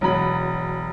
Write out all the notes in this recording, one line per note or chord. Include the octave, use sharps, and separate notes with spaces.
E1 F#3 B5